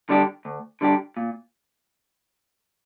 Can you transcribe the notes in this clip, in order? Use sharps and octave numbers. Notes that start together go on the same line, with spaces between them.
D3 G3 D4 G4
D2
D3 G3 D4 G4
A#2